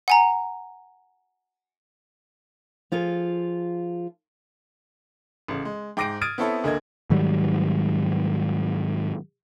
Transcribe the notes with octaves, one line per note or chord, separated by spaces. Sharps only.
F#5 G#5 A#5
F3 F4 G#4 A4
A1 C#3
G#3
G#2 G5 D6 A#6 C7 D7
D#6 F6 G#6 A6 D7 D#7
B3 C4 E4 A4 C#5 E5
D2 D3 A#3 D#5 G#6
G#2 D#3 F#3 G3